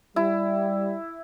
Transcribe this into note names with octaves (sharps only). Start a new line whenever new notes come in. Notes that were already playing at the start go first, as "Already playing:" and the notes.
G3 E4